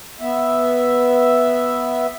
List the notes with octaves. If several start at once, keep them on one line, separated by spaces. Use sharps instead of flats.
B3 E5